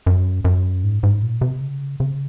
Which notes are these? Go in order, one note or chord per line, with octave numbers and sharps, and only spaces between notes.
F#2
F#2
G#2
G#2
A#2
C3
C#3
C#3